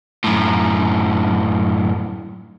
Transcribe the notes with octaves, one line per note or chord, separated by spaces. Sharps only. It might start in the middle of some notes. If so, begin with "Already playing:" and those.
F#2 A2